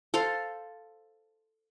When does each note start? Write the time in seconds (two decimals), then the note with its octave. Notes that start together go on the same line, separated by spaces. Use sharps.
0.14 A4 C5 F5 C6